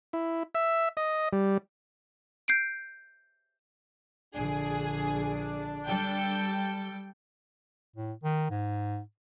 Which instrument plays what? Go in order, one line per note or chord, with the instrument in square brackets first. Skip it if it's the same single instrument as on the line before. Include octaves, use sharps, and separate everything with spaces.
[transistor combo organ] E4
E5
D#5
G3
[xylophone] G6 C7 D7
[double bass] A#1 D3 [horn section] D4 [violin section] G#4
[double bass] G3 [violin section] A4 G5
[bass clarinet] A2
D#3
G#2